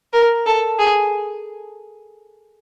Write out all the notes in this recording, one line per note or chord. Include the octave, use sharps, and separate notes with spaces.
A#4
A4
G#4